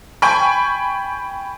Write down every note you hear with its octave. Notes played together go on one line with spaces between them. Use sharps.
G5 G#5 B5 C#6